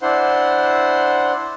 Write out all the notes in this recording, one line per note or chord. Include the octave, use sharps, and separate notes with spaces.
D4 E4 C5 F#5 C6